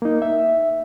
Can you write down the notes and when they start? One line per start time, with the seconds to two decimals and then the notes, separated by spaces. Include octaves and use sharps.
0.02 A#3 D#4
0.22 E5